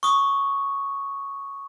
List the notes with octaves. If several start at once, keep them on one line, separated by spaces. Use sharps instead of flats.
C#6 D#6